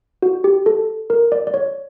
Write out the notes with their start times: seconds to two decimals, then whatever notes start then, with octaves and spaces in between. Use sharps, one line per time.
0.22 F#4
0.44 G4
0.66 A4
1.10 A#4
1.32 D5
1.47 D5
1.54 C#5